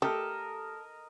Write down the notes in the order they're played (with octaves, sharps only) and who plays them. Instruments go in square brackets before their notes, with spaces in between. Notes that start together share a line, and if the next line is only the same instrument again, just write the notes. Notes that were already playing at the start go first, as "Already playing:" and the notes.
[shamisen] A3 [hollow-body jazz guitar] G4 [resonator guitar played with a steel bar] A4 [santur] A#4 D#5